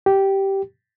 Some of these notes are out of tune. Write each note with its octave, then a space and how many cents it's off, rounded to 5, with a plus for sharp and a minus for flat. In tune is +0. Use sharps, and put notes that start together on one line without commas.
G4 -10